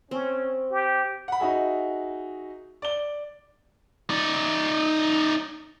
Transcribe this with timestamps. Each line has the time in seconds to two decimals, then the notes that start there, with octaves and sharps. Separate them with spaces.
0.11 C4 C#4
0.71 G4
1.28 F#5 B5
1.40 D#4 F#4 G#4 E5
2.82 D5 G7
4.10 D#4 D5